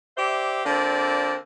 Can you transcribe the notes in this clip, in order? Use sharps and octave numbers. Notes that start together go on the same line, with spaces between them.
G4 C5 D5 E5
D3 A#3 C4 F4 D5